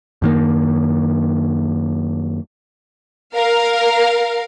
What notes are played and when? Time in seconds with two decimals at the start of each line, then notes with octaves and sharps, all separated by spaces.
0.22 F#2 D#3 A#3
3.34 A#4 F5